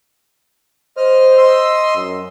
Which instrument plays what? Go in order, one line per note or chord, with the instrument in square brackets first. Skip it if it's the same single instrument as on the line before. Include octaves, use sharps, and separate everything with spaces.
[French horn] C5 [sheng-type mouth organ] D#5 F6
[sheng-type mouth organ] D#5 C6 E6
[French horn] F#2